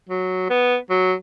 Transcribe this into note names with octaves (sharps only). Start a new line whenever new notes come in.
F#3
B3
F#3